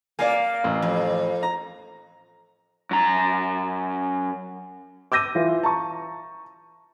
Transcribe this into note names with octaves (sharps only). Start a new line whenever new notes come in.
A#3 D5 F5 G#5
A1
F2
A#5
F#2 A#5
D6 E6 G6 A#6 D#7
E3 F4
A5 A#5 C#6